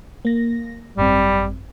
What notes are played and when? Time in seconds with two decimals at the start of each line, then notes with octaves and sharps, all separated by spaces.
0.25 A#3 A#6
0.97 G#1 F#2 G3 C4